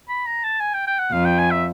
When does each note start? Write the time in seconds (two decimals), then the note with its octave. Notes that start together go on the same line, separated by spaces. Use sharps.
0.09 B5
0.26 A#5
0.44 A5
0.60 G#5
0.74 G5
0.87 G5
0.99 F#5
1.12 F2 F5
1.25 G5
1.38 G#5
1.51 E5